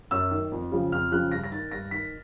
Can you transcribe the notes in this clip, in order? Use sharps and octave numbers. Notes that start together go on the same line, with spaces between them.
F#2 E6
D#3
F2
C#3 F3
F2 F6
C#3 F3 F#6
G2 A#6
A#6
D#3 A6
G2 A#6
D#3 B6